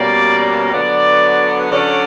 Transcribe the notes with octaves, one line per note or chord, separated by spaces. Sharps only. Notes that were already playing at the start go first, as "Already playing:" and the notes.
Already playing: B2 G3 A#3 C#4 D5
D3 F#3 B3 D5
D3 F#3 C#4 D5